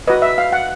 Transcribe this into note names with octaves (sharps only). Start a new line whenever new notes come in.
F#4 B4 D#5
E5
F5
F#5